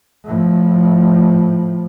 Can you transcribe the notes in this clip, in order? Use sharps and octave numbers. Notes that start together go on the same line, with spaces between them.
A2 F3